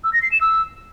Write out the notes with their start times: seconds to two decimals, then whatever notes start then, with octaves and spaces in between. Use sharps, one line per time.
0.04 E6
0.13 A#6
0.22 C7
0.32 E7
0.41 E6